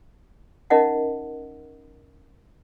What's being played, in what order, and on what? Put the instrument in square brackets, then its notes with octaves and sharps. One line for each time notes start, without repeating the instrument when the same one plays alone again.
[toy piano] C#4 D#4 A#4 D#5 E5 F#5